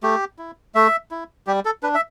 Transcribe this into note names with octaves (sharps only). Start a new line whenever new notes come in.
A3 G4
E4
A3 E5
E4
G3 G4
A4
D4 B4
E5